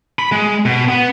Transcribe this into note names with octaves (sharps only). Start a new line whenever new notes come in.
B5
G#3
B2
B3